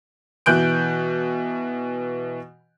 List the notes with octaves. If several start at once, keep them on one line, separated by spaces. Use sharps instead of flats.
B2 E3 F#6 G6 D7